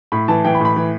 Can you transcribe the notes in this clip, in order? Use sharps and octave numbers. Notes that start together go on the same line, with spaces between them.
A2 B5
E3 A5
E3 G5
B5
A2
B5
E3